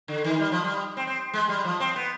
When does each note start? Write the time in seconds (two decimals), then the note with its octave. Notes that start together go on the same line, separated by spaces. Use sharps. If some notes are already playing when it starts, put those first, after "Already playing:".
0.08 D3
0.24 D#3
0.40 G3
0.52 F3
0.64 G3
0.97 C4
1.07 C4
1.34 G#3
1.49 G3
1.65 F3
1.80 C4
1.96 B3